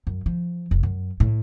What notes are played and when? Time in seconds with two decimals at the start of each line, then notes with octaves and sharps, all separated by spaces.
0.07 F#2
0.26 F3
0.71 F1
0.83 F#2
1.20 A2